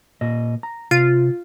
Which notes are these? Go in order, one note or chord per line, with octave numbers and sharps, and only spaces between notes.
A#2 D#5
A#5
C3 F4